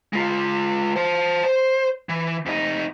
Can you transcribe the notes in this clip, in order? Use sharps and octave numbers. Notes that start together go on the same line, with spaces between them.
G#3 F4
C5 A5
C5
E3
F2 D#4